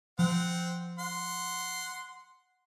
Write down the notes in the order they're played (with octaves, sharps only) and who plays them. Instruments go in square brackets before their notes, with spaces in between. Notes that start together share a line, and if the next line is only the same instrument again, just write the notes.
[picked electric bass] F3 [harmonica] C4 F#5
[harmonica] F#5 C6